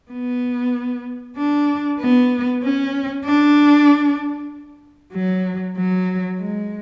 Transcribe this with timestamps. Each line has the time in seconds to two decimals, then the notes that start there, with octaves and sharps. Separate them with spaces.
0.12 B3
1.37 D4
2.00 B3
2.63 C#4
3.26 D4
5.14 F#3
5.77 F#3
6.40 G#3